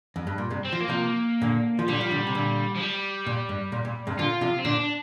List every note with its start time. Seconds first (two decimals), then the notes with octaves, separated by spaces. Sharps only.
0.16 F2
0.27 G2
0.38 A#2
0.50 G2 C3
0.65 C4
0.73 F3
0.80 A#3
0.89 C3 F3
1.42 A#2 D3
1.79 F3
1.88 A#2 D3 G3
2.01 F3
2.11 A#2 D3
2.27 C3
2.35 A#2 D3
2.76 F3
2.80 G3
3.27 A#2
3.49 G2
3.72 A#2
3.85 A#2
4.07 G2 C3
4.19 A#2 D3 F4
4.41 C3 F3
4.59 C4
4.65 A#2 D3 D4
4.80 D4